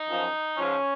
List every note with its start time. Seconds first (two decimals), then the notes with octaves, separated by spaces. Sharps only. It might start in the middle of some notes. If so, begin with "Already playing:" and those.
Already playing: D#4
0.09 F#2 F3
0.57 G#2 F3 C#4